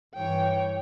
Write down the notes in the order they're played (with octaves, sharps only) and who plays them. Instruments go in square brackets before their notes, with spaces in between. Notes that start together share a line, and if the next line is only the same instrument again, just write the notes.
[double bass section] G2 E3 [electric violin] C#5 G5